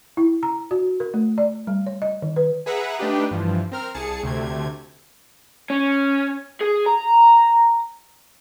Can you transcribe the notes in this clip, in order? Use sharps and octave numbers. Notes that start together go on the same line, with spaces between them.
E4
A#5
F#4
A#4
A3
D5
G3
C#5
D#5
D#3
B4
G#4 B4 E5 F#5 A#5
A3 D4 D#4 G4 B4
G2 E3 F3
C4 A#4 F6
C2 G#4 A5 C#7
D2 C3 A3 G#6
C#4
G#4
A#5